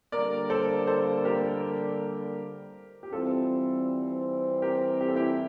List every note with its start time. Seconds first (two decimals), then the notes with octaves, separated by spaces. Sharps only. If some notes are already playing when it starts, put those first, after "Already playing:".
0.12 D3 G3 A#3 A#4 D5
0.50 A4 C5
0.87 A4 C5
1.25 G4 A#4
3.03 G4
3.13 E3 G3 C4 F4 A4
4.62 G4 A#4
5.01 G4
5.08 A4
5.15 E4 G4